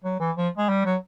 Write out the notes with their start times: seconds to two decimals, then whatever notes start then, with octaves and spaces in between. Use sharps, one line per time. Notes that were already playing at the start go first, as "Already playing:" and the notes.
0.04 F#3
0.20 E3
0.37 F3
0.57 G#3
0.69 G3
0.85 F#3